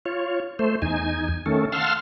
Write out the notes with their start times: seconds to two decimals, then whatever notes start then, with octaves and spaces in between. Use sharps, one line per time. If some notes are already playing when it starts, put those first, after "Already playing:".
0.06 F4 C#5
0.59 A3 C5
0.82 E2 D#4 G#5
1.46 D#3 A3 C#4 A4
1.72 F5 F#5 A5 C6 E6 F6